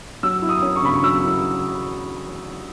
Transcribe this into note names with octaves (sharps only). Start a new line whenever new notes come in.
F#3 E6
E4
D#6
C#4
C#6
C#3 B5
C#6
F#3 E6
E4